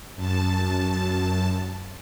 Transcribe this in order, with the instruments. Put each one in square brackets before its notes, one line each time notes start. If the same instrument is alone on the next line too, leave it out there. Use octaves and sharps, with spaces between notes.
[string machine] F#2 A5